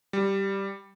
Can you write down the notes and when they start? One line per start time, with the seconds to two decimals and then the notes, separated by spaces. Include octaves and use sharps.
0.13 G3